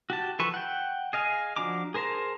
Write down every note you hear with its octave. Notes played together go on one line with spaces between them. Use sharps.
F#4 G4 A5
E3 F3 A4 B4 C#6
F#5 G5
G#4 D#5 F5 G#5
F3 D4 F#4 A#5 D6
G#4 A#4 C5 A5 A#5